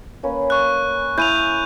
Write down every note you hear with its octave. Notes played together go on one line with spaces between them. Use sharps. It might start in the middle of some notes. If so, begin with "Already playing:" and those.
A#3 C#4 B4
C#6 F#6
E4 G#5 A#5 G6 D#7 F7